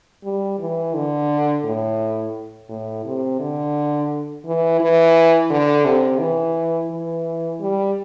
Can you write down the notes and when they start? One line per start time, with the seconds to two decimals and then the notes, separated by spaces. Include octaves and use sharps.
0.24 G3
0.59 E3
0.94 D3
1.64 A2
2.69 A2
3.05 C3
3.40 D3
4.45 E3
4.80 E3
5.50 D3
5.85 C3
6.20 E3
6.91 E3
7.60 G3